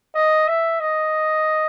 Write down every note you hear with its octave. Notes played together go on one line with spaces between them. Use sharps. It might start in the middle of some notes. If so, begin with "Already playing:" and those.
D#5
E5
D#5